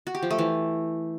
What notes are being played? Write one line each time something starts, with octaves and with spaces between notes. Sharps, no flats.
F#4
G4
F3
A3
E3